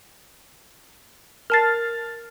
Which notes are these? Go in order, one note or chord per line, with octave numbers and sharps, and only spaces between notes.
A#4 A5 F6 A6 C7